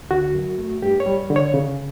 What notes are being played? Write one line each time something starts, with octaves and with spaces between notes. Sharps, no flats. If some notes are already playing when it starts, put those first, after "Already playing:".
Already playing: D2
D3 F#4
F#2
A3
G2 G4
C#5
G3
D3
C#5
C#3